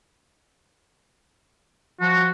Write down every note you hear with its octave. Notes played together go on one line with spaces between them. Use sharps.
F3 F#4